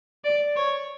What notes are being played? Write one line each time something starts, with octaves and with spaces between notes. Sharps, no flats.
D5
C#5